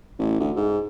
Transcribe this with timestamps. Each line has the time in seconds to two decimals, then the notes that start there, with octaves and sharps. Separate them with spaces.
0.19 A1
0.40 D2
0.56 G#2